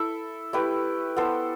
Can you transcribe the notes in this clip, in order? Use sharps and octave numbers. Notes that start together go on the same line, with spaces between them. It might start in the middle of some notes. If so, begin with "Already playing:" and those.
Already playing: E4 A4 E5
A3 E4 G4 B4
B3 E4 A4 C5